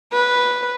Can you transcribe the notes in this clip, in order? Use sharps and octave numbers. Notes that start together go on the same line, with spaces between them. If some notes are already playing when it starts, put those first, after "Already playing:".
B4